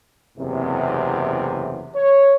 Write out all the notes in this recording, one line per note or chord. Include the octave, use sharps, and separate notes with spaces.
F#1 E2 C3
C#5